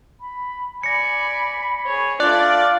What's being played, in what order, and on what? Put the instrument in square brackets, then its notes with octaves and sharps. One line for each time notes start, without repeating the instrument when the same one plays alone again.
[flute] B5
[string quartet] D5 G#5 [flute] B5 [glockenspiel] A#6 C#7
[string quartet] G#4 C#5
[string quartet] A3 D4 [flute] F4 [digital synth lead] D5 [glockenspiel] F#6